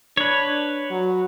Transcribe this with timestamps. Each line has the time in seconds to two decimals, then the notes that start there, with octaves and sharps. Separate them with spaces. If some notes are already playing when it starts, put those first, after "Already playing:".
0.17 D4 B4 C#5
0.91 F#3